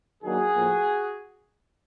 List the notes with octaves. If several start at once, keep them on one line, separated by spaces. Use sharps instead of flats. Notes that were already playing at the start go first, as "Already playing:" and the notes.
D#3 F#3 A#3 D4 F#4 G#4
A2 F3 A#3